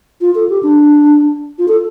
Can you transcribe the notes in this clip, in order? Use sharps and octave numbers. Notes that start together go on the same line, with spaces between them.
F4
A4
G4
D4
F4
A4